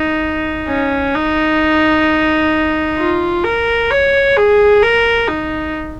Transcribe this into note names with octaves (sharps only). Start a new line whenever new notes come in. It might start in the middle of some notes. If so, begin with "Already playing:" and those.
Already playing: D#4
C#4
D#4
F4
A#4
C#5
G#4
A#4
D#4